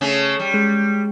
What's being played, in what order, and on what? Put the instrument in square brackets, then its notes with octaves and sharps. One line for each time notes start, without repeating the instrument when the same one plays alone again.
[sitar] C#3 A3 C#4
G3
[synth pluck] G#3